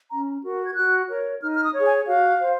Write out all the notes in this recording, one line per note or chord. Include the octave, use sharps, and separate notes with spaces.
C#4 A#5
F#4 A#4
G#6
F#4 F#6
A#4 C#5
D#4 F6
F6
D#6
G#4 C#5
G#5
F#4 F5
C5